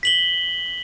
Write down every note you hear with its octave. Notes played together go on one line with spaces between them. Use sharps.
B6 F#7 G7